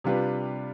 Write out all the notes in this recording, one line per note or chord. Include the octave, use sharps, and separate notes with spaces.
C3 G3 D4 F4 B4